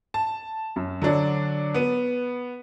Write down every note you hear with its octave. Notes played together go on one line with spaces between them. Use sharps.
A5
F#2
D3 F#3 D4 D5
B3 D#7